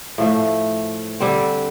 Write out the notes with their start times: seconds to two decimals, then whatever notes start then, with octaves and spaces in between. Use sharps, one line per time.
0.18 A2 F3 A3
1.20 D3 G3 C4